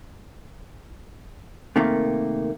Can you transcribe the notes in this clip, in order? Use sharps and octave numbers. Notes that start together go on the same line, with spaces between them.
C3 D#3 A3 A#3